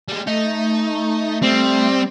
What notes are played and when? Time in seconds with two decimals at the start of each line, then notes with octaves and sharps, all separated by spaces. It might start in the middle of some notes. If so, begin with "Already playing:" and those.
0.09 G3 G#3
0.27 A3 D#4
1.43 G3 C4